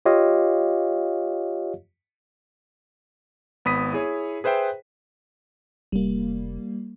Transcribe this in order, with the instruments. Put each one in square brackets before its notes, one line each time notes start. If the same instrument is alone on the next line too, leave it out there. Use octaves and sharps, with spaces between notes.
[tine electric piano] F4 G4 C#5 D#5 F5
[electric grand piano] G#1 B3 B5 D#6 B6 D#7
E4 G#4 C#5
G#4 B4 C5 E5 G5
[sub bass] F1 [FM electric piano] G3 A#3